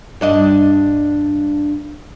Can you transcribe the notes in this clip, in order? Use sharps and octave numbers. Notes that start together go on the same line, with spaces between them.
G2 D4 D#5